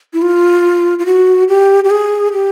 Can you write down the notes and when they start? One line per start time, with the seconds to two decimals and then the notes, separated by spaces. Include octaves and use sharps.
0.13 E4
0.22 F4
0.99 F4
1.06 F#4
1.48 G4
1.84 G4
1.90 G#4
2.33 G4